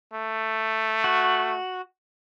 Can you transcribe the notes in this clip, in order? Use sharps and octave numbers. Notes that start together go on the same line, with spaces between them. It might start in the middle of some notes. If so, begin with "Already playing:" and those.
A3
F#4